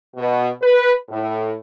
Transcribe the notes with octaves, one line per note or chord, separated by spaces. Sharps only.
B2
B4
A2